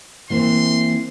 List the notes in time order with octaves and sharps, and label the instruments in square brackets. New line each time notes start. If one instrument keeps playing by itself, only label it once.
[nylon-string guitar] E3 A#3 C4 [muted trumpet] C6